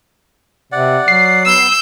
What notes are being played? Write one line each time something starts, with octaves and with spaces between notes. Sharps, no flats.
C3 D5 F#5
F#3 C7
B3 E6 G6